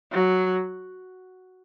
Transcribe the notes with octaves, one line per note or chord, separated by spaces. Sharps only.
F#3